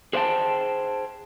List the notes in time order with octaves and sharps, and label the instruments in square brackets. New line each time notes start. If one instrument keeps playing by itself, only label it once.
[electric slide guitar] G#4 C5 D#5 F5 G5 A5